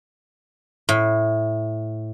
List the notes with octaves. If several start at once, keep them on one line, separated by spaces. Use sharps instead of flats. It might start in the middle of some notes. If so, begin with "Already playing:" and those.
A2